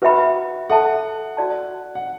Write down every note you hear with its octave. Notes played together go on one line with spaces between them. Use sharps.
F#4 B4 E5 B5
A4 E5 F#5 A5
F#4 D5 A5
F#5